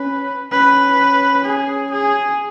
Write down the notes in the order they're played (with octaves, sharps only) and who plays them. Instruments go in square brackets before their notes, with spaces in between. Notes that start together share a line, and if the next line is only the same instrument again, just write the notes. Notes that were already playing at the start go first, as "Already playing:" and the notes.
Already playing: [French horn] C#4 [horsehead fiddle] B4
[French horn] C#4 [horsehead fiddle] B4
[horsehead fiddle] G#4
G#4